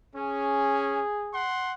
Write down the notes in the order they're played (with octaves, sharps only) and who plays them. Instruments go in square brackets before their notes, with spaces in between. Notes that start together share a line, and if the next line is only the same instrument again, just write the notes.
[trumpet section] C#4 [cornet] G#4
[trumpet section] F#5 C6